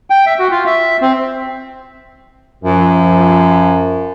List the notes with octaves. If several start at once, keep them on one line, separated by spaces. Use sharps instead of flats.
G5
E5
F#4
F4
E5
C4
F#2 F3